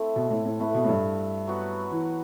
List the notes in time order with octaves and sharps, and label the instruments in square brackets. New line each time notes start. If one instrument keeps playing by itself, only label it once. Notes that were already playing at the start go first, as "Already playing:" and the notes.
Already playing: [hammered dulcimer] A3 C4 E4
[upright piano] B2
A2
A2
[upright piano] A2 [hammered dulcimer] A3 E4 B4
[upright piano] B2
A2
G2
[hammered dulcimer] F#3 B3 F#4 B4
[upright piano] E3